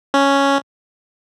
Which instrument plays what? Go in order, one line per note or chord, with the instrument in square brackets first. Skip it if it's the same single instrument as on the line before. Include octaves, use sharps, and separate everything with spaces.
[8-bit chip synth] C#4